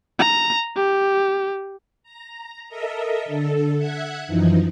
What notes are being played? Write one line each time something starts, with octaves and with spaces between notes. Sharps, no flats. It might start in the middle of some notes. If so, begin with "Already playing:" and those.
A#5
G4
A#5
A4 A#4 D#5 E5
D3 A4
E5 F#5 F#6 G#6
F#2 E3 F3 D#4